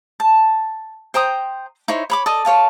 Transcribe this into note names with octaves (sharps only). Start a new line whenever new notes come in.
A5
C5 G5 A#5 D#6
D#4 E4 C5 C#5
C#5 B5 D6
A4 D5 D#5
A4 C#5 F5 A5